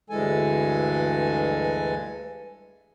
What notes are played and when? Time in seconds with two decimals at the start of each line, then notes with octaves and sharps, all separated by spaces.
0.10 D2 G2 E3 G#3 A4 G#5